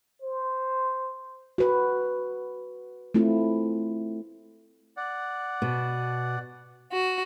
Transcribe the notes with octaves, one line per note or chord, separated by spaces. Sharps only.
C5
F#4 B4
A3 C4 E4 F4
D5 F#5
B2
F#4